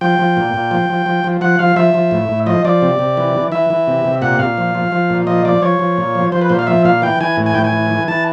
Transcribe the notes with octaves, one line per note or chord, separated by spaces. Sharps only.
F3 G5
F3
A#2
A#2
F3
F3
F3
F3
F3 F#5
F3 F5
F3 E5
F3
A2
A2
F3 D#5
F3 D5
C3
C3
E3
E3
E3 E5
E3
C3
C3
A#2 F#5
A#2 F5
F3
F3
F3
A#2
F3 D#5
F3 D5
F3 C#5
F3
A#2
F3
F3 C5
B4
A#2 C5
F5
F3 E5
A#2 F5
E3 G5
E3 G#5
A2
G#5
A2 G5
G#5
E3
E3
E3 A5